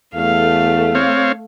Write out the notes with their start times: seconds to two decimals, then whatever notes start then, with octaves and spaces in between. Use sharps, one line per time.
0.15 E2 A3 F5
0.95 C4 C#5 F5